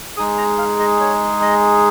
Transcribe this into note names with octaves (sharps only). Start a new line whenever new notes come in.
G#3 D#4 G#4 D#6
A#5
F5
D#5
C#5
D#5